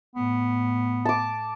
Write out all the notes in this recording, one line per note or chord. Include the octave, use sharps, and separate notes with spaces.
A2 B3
A5 D6